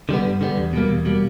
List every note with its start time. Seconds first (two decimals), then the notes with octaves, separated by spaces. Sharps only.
0.09 D3 G3 B3
0.25 G2
0.41 D3 G3 B3
0.57 E2
0.73 B2 G3 A#3
0.89 E2
1.05 B2 G3 A#3